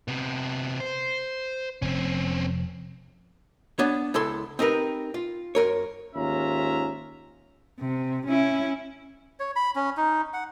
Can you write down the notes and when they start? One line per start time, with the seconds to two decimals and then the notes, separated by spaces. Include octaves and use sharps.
0.08 C3 B3
0.80 C5
1.82 F1 C4 C#4
3.79 B3 D4 C#5
4.14 C#2 E4 A4 C6
4.59 C4 D#4 G4 A#4 B4
5.14 F4
5.55 F#2 A#4 C#5
6.15 D#2 G#2 C#4 F4 E5 A#5
7.80 C3
8.28 C#4 E4
9.40 C#5
9.56 B5
9.75 C#4
9.97 D#4
10.33 F#5